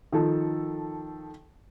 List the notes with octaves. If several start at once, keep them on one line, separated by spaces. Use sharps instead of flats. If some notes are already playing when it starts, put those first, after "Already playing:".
D#3 F3 A4